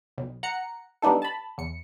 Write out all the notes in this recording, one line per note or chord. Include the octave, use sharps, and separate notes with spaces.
B1
F#5 A#5 C#7
G3 B3 D4 D#4 A4
A5 B5
E2 C#7